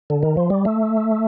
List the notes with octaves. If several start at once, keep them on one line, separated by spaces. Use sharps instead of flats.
D3
D#3
F3
G3
A3